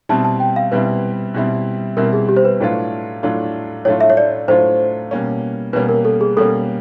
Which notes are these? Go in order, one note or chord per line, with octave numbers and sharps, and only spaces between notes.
B2 G3 C4 E4 A5
A5
G5
F5
B2 G3 C4 E4 B4
B2 G3 C4 E4
B2 G3 C4 E4 A#4
G#4
G4
C5
B4
A2 F#3 A3 D4 F4
A2 F#3 A3 D4 F4
A2 F#3 A3 D4 F4 C#5
E5
C#5
D5
A2 F#3 A3 D4 F4 C5
B2 G3 A#3 C#4
B2 G3 A#3 C#4 B4
A#4
A4
G#4
B2 G3 A#3 C#4 A4